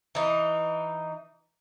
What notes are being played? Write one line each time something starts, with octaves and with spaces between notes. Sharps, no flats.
E3 D#4